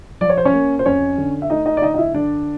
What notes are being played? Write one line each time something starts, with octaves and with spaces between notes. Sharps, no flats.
F3 D5
C#5
C5
C#4 C#5
A#3
C5
F2 C#4 C#5
D3
E5
A3 D#4 D#5
D#4 D#5
D5
D3 D#4 D#5
D#5
E4 E5
D3 D4 D5